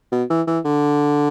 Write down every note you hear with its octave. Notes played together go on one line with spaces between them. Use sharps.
B2
E3
E3
D3